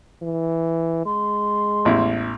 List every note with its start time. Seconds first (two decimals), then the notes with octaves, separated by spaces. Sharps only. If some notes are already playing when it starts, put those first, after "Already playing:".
0.22 E3
1.06 G#3 C6
1.85 A1 E2 E4